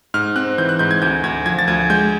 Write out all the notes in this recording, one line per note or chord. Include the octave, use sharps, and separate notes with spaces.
G#2 F6
C4 F#6
E3 G6
F#6
G#2 G6
G#6
D2 G6
D2 G#6
F3 G#6
A6
D2 G#6
G#3 G6